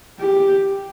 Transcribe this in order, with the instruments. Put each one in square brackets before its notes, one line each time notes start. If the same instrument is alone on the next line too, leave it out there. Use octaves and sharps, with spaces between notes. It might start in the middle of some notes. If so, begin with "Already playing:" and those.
[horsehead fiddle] G4